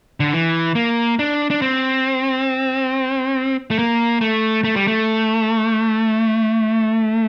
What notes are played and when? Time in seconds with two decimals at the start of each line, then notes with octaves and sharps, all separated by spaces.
0.20 D3
0.33 E3
0.75 A#3
1.19 D4
1.50 D4
1.62 C4
3.71 A3
3.79 A#3
4.21 A3
4.64 A3
4.76 G3
4.87 A3